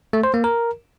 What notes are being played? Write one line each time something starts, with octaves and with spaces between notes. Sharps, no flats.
A3
C5
A#3
A#4